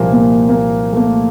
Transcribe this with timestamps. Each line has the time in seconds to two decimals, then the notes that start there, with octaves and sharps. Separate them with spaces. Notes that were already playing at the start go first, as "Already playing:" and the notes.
Already playing: C2 A#2 F3 A#3
0.12 A#3
0.49 A#3
0.93 A3
0.97 A#3